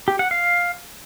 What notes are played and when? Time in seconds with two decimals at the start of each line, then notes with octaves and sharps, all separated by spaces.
0.08 G4
0.19 F#5
0.31 F5